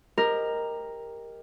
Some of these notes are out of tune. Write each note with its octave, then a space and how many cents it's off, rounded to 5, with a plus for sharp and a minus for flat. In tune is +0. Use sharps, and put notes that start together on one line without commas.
G4 +25 A#4 +0 D#5 +0